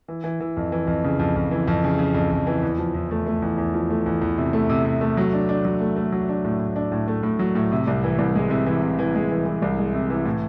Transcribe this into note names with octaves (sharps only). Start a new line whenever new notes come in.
E3
E3
E3
F2
E3
F2
C#3
F2
F2
E3
F2
C#3
C#3
F2
F2
E3
E2
F3
E2
A3
A3
E2
E2
F3
A3
E2
E2
C3
A3
C3
C3
A3
F#3
D4
D4
F#3
A3
A3
F#3
D4
A2
A2
D4
A2
A3
A2
F#3
A2
C3
C2
E3
C2
G#3
C3
E3
C3
E3
G#3
E3
E3
C2
G#3
C3
E3
A2